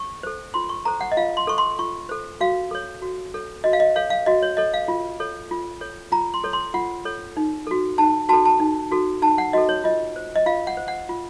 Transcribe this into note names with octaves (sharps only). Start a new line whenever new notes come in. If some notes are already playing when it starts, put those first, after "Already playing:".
Already playing: C#6
A4 C5
F4 C6
C#6
A4 C5 A#5
F#5
D#5
F4 F5
C6
A4 C5 C#6
C6
F4 C#6
A4 C5
F#4 F5
A4 C#5
F#4
A4 C#5
F#4 D#5
F5
D#5
A4 C#5 F5
F5
F#4 D#5
C#5
A4 C#5 D#5
F5
F4
A4 C#5
F4
A4 C#5
F4 A#5
C6
A4 C#5
C6
F4 F#5
A4 C#5
D#4
F#4 A4
D#4 A5
F#4 A4 A5
A5
D#4
F#4 A4
D#4 A5
F#5
F#4 A4 D#5
C#5
F4 D#5
C5
D#5
F4 F5
F#5
C5
F#5
F4